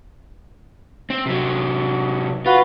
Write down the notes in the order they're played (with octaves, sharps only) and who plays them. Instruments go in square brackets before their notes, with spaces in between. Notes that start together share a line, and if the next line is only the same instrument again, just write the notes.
[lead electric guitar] C4
C3 F#3
[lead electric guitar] F4 [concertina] F#4 B4